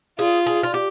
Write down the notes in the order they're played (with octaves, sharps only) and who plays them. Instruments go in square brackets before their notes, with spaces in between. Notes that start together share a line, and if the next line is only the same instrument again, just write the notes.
[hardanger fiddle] F4 [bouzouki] G#4
[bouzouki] G#4
F4
G4